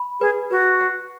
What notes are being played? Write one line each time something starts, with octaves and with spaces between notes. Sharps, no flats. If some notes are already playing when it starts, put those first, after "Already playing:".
Already playing: B5
G#4 B4
F#4 B4
F#5